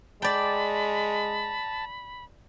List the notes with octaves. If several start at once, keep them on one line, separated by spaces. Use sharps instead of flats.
G#3 D5 G5 A5 B5